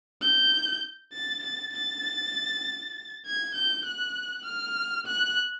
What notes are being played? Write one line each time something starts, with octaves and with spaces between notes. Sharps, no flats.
G6
A6
A6
A6
G#6
G6
F#6
F6
F#6